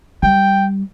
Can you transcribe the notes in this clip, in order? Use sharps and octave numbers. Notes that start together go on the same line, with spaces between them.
G3 G5